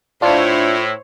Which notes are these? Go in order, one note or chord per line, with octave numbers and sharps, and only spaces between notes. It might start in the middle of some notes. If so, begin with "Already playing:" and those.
A2 D4 E4 F4 C5 C#5